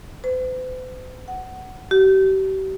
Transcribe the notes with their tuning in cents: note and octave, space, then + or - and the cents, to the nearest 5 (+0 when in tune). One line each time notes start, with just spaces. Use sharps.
C5 -45
F#5 +15
G4 -40